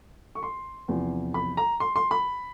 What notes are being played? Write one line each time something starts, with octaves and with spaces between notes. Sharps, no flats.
C#6
C6
E2 C3 F3
B5
A#5
C6
C6
B5